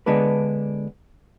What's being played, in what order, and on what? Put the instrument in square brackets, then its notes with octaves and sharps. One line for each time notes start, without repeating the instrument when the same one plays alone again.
[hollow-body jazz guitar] D3 G#3 B3 D4 B4